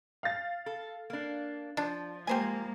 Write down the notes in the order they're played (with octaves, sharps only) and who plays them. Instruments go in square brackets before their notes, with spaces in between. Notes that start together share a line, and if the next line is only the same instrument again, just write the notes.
[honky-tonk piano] F5 A6
[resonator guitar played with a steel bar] A4
A#3 D4
[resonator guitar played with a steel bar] F3 [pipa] D4
[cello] G#3 A#3 [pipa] G4 C5 G#5